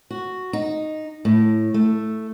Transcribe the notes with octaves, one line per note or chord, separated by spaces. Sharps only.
F#4
D#4
A2
A3